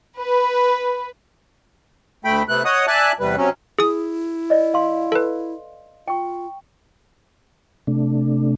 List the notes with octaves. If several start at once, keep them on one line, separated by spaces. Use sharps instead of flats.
B4
D2 A3 G5 B5
C3 A3 B3 F#6
C#5 D#5 F#5 D#6
D5 E5 G#5 A5 F#6
E2 C3 G3 B4
C3 F#3 C#4
E4 G#4 D#6
D5 D#5
F5 C6
A4 B4
F4 G5 C#6
C3 A3 D4